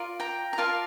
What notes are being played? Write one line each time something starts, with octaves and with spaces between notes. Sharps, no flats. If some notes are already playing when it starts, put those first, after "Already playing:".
Already playing: F4 A#4 D5
G5 A#5
A#5
F4 A#4 D5 F5 A5